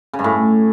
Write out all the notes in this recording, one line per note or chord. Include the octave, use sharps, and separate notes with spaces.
C#3
G2
A2